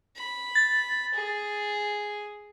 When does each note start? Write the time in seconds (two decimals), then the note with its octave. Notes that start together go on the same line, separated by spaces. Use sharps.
0.16 B5
0.55 A6
1.14 G#4